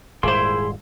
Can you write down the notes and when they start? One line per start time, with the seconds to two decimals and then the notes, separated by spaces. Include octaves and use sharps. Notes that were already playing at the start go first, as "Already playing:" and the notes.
0.23 D#1 G#2 G3 A#3 E4 G#4 C5 C6